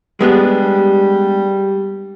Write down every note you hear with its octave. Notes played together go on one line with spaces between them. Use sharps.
G3 G#3 B3 D4